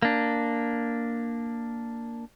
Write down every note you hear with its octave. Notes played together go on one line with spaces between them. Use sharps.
A#3 D4